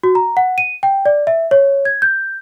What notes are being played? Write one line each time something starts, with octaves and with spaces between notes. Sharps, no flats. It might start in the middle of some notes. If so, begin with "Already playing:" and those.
F#4
A#5
F#5
D#7
G5
D5
E5
C#5
G#6
G6